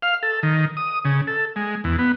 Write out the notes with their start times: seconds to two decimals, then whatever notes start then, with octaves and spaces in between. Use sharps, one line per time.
0.02 F5
0.23 A4
0.43 D#3
0.77 D#6
1.05 C#3
1.27 A4
1.56 G#3
1.84 E2
1.99 B3